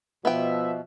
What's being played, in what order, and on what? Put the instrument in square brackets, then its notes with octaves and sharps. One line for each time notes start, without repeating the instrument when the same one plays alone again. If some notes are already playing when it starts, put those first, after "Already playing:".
[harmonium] B2 [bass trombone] F3 [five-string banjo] B3 G5 [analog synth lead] E5